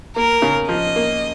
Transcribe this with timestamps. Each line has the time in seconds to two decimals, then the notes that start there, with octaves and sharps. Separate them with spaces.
0.16 A#3 A#4
0.42 C#3
0.69 F3 D#5
0.96 A#3